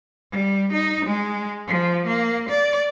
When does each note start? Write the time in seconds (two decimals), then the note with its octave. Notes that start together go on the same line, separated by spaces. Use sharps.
0.31 G3
0.72 D#4
1.05 G#3
1.67 F3
2.06 A#3
2.49 D5